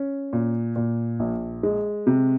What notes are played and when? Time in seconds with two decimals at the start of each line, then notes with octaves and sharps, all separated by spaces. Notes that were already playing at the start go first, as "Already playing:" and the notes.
Already playing: C#4
0.33 A#2
0.76 A#2
1.20 A#1
1.63 G#3
2.07 C3